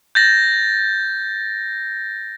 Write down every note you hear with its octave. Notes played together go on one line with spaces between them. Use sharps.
G6 A6 A#6